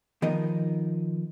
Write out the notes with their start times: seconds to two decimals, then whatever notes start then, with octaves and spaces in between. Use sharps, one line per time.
0.22 D#3 F3 B3 D#4 A#4 D#5